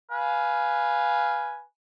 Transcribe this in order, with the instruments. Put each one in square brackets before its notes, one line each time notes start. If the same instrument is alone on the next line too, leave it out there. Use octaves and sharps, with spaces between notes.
[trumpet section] B4 F5 G#5